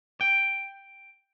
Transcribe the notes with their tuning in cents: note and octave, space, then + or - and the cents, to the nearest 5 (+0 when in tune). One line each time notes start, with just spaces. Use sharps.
G5 +5